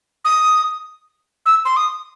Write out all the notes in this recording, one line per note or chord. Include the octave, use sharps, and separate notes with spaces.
D#6
E6
C6
D#6